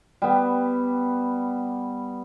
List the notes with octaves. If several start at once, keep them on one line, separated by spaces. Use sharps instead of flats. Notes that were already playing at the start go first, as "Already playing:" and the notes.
G3 B3